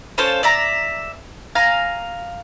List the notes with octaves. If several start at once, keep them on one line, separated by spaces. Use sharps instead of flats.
C#4 F4 A4 C5
D5 E5 A#5
F5 G#5 A#5